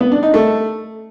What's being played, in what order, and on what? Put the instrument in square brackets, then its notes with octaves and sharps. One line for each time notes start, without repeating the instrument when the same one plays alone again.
[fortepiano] B3
D4
D#4
A3